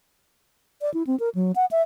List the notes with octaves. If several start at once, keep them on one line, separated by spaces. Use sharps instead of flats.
D5
E4
C4
A#4
F#3
F#5
E5